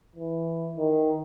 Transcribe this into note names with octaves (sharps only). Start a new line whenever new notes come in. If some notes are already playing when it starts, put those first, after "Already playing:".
E3
D#3